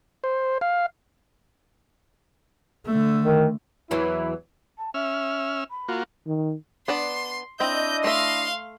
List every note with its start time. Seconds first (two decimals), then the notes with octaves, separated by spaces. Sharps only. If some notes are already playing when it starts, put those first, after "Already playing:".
0.24 C5
0.61 F5
2.86 D3 A3
3.22 D#3
3.91 E2 E3 F#3 E4
4.78 A5
4.94 C#4 E5 E6 F6
5.70 B5
5.88 A#3 F4 F#4
6.27 D#3
6.88 B3 D4 D5 C6
7.60 C4 D4 E4 D#5 G6
8.04 A3 E5 F5 C6